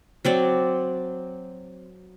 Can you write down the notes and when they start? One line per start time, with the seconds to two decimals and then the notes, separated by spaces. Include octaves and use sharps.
0.25 F#3 C4 D5